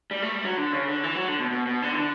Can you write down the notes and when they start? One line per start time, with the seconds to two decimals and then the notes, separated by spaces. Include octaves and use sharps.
0.11 G3
0.22 A3
0.34 G3
0.45 F#3
0.57 D3
0.73 C#3
0.88 D3
1.03 E3
1.16 F#3
1.28 D3
1.39 B2
1.51 B2
1.67 B2
1.82 D3
1.93 E3
1.98 D3